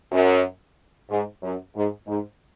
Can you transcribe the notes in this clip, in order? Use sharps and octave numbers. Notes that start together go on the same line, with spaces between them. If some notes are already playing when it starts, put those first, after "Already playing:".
F#2
G#2
F#2
G#2
G#2